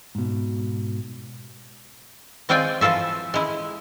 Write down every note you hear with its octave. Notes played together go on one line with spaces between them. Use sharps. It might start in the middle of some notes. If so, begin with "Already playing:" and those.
G#2 B2
G#3 C4 F4 D5 G5 G#5
E3 F3 F4 A4 E5
G#3 E4